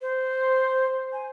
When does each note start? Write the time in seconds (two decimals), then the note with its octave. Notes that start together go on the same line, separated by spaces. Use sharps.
0.02 C5
1.13 G#5